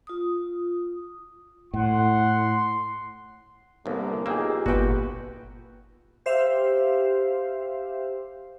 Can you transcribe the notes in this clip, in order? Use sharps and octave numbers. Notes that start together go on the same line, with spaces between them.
F4 D#6
A2 F#5 C6
G1 C2 D3 E3 A#3
B1 A#3 D#4 F4 G4 G#4 G5 E6
G1 A#2 B3 F#4 B4 G5
G4 C5 E5 F5